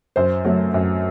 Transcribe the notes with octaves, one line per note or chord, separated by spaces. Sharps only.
F#2 C5
F#3 A3
F#2